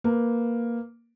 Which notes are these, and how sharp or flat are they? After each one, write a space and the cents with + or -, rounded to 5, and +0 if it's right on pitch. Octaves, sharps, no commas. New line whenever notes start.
A#3 +0 B4 +0